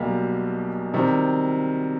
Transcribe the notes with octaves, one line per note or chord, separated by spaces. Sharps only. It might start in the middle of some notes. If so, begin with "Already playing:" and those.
Already playing: B1 B2 G3 A#3
C3 D#3 G3